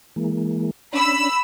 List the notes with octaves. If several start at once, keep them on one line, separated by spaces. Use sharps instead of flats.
E3 G#3 A#3
C#4 D4 B5 E6